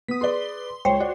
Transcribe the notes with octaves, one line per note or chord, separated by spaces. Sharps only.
B3 D#6 B6
G#4 B4 D5 C6 G7
C#2 C5 C#5 G5
F#4 D5